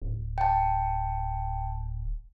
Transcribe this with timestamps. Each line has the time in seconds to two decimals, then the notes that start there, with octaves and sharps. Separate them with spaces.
0.02 D1
0.38 G5 A5